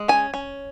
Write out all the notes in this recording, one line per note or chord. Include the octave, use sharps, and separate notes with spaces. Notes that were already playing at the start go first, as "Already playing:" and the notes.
Already playing: G#3
C#4 G#5
C#4